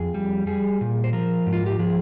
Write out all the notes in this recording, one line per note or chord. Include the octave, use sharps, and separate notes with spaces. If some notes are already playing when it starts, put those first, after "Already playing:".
Already playing: F2 G#4
G3
G3 G#4
A#2
C5
F3 A#4
G#2
F4
G4
F3 G#4